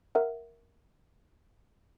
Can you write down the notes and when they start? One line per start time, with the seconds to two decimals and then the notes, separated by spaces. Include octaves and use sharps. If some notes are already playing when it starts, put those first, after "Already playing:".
0.15 A#4 E5 F#5